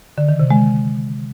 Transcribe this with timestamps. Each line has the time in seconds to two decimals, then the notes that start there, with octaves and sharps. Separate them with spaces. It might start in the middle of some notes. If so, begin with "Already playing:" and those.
0.18 D3
0.29 D#3
0.40 C3
0.50 G#3